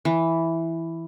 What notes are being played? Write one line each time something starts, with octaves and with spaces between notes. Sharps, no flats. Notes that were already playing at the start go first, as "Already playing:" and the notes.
E3